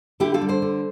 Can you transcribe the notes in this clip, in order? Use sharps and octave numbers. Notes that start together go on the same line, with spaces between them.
D3 E4 G4
F4 A4
G3
A4 C5
D3